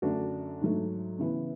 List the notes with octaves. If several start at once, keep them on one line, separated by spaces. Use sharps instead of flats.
F#2 D3 A3 D4 F#4
G#2 F#3 A3
C#3 E3 B3 E4